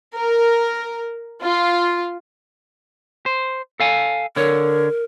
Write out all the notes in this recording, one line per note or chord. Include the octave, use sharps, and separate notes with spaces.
A#4
F4
C5
A4 F5 G#5
D3 A#4 C#5